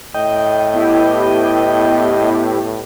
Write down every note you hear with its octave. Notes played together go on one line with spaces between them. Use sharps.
A2 D#5 G5
B3 E4 G4